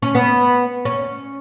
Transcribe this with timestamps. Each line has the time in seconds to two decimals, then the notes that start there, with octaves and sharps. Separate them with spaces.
0.02 C#4
0.15 B3
0.85 C#4